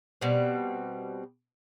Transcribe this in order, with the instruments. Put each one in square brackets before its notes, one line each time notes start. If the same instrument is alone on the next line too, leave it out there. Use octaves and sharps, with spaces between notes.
[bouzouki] B2 G3 C4